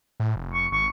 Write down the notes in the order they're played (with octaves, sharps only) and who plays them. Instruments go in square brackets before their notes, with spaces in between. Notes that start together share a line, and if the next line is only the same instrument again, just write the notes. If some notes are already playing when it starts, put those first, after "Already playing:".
[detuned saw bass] A2
F1
[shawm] C#6
[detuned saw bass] G#1 [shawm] C#6